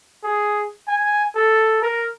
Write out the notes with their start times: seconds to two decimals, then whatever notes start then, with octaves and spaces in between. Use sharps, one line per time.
0.23 G#4
0.88 G#5
1.35 A4
1.82 A#4